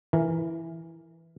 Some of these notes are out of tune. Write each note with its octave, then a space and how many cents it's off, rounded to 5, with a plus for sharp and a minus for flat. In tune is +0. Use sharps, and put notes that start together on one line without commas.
E3 +0 A#4 +0